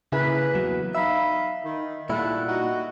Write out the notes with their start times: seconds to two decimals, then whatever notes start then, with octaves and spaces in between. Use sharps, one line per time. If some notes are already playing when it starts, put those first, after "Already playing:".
0.12 C#3 A#3 E4 G#4 B4
0.53 E2 F#3
0.95 D#4 E5 F5 B5
1.64 D#3
2.09 A#2 G3 A3 E4 F#5
2.46 D#4 F#4